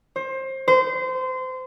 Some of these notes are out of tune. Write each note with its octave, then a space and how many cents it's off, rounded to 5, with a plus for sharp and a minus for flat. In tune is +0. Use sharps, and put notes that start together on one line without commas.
C5 +25
C5 -25